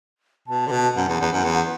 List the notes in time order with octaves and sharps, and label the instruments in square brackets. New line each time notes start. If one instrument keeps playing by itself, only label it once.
[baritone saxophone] B2 [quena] A5
[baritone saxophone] D3
[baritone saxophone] B2 [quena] A5
[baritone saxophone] F#2 [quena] F#5
[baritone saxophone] E2
E2
F#2
E2